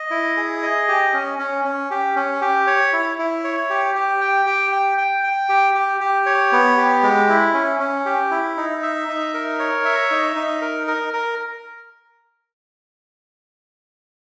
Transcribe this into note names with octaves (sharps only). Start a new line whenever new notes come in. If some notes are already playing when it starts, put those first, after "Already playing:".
Already playing: D#5
E4
G#4
D#5
G4
C#4
C#4
C#4
G4
C#4
G4
C#5
E4
E4
C#5
G4
G4
G5
G4
G5
G5
G5
G4
G4
G4
C#5
B3
G4
G#3
E4
C#4
C#4
G4
E4
D#4
E5
D#4
A#4
C#5
E5
D#4
D#4
A#4
A#4
A#4